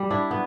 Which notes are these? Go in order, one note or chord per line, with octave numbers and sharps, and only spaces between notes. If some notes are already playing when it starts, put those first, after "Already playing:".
Already playing: G3
D4 E4
B3